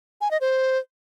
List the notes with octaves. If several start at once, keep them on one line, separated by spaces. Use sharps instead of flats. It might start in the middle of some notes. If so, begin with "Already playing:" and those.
G#5
D#5
C5